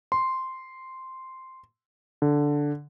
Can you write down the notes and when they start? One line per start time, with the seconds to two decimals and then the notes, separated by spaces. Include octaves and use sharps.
0.12 C6
2.22 D3